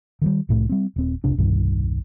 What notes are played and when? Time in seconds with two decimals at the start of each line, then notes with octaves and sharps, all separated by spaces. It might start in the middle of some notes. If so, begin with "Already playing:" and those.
0.22 D#3 F#3 G3
0.49 C2 A2 A3
0.69 G3 C4
0.96 D#1 C4
1.24 F1 C#2 C3 D4
1.38 E1 C2 G2 D#3